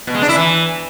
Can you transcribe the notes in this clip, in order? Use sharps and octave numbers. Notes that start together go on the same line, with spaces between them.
B2
G#3
D4
E4
E3